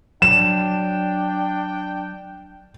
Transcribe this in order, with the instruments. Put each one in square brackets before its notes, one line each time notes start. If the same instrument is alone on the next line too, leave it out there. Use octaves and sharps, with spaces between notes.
[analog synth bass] F#3 [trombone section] D4 [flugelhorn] G5 [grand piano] E7